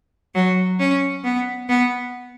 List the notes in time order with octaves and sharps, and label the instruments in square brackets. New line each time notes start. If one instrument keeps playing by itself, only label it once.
[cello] F#3
C#4
B3
B3